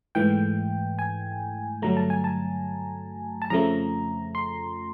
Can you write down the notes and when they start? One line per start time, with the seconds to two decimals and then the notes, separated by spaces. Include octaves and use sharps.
0.15 G#2 E3 A3 G5
0.99 G#5
1.82 G2 D3 F#3 A3 A#5
1.97 A5
2.10 G#5
2.24 A5
3.42 A5
3.50 F2 C#3 F3 A3 A#5
4.35 C6